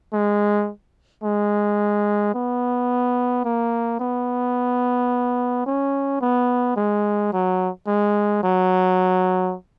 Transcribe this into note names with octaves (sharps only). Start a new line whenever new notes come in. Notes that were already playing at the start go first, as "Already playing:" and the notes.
G#3
G#3
B3
A#3
B3
C#4
B3
G#3
F#3
G#3
F#3